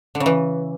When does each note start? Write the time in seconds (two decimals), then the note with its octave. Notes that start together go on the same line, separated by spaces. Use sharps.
0.15 D3
0.20 C#3
0.26 E3